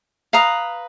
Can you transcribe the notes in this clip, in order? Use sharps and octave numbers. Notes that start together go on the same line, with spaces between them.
B4 F5 A#5 D#6